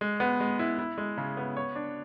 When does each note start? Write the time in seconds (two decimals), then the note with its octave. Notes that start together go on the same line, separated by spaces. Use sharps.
0.01 G#3
0.20 B3
0.40 G#3
0.59 E4
0.79 E4
0.98 G#3
1.18 C#3
1.37 B3
1.57 C#5
1.75 D4